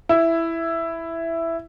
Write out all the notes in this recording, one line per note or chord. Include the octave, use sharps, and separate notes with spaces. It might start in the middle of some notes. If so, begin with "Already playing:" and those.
E4